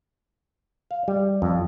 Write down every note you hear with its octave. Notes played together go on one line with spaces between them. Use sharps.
F5
G3
F2